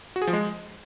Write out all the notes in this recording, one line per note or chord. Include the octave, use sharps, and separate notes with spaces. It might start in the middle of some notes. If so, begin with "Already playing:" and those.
F#4
G#4
F3
G#3